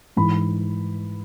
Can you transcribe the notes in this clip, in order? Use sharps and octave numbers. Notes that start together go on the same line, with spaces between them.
G#2 E3 B5